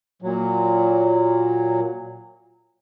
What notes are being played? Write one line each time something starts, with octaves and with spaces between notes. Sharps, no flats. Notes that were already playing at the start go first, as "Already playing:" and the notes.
A#2 F#3